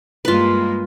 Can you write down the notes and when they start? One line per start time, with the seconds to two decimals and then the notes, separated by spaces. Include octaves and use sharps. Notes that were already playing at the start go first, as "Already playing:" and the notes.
0.25 G2 G#3 A#3 F4 B4